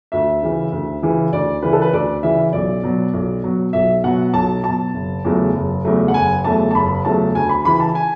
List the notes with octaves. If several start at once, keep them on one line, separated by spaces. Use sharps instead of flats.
D2 E5
C#3 E3
D2
C#3 E3
D2 D5
C#3 E3 B4
A4
B4
D2 D5
C#3 E3 E5
B1 D5
B2 F#3
B1
B2 F#3
B1 E5
B2 F#3 F#5
B1 A5
B2 F#3 A5
F#1
E2 C#3 F#3 A3
F#1
E2 C#3 F#3 A3
F#5
F#1 G#5
E2 C#3 F#3 A3 A5
A5
F#1 B5
E2 C#3 F#3 A3 A5
D2 G#5
B5
C#3 E3 B5
A5
G#5